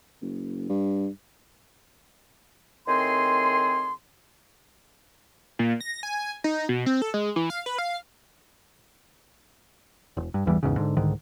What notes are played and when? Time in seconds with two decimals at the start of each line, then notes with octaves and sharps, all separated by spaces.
0.21 F#1
0.69 G2
2.88 A2 D#3 C4 G#4 C6
5.59 A#2
5.81 A#6
6.03 G#5
6.44 D#4
6.69 B2
6.86 C4
7.02 A4
7.14 G#3
7.36 E3
7.50 F5
7.66 B4
7.78 F5
10.17 E1
10.34 G2
10.46 G1 E2 E3 G3
10.63 G#1 E2 G#2 C#3
10.76 G#2 D3
10.97 C2 G#2 D3 D#3